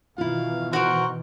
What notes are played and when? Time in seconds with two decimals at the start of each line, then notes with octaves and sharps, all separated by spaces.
0.18 B2 D#3 E3 E4 F4 F5
0.73 F#4 A#4 C5 F#5